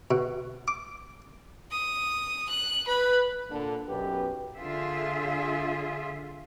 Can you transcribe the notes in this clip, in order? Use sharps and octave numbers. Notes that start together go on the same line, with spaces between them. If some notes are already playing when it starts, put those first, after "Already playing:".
B2
D6
D#6
F#6
B4 B5
A#2 D3
B1 F#2 G4 B4
D3 F4 G#4 E5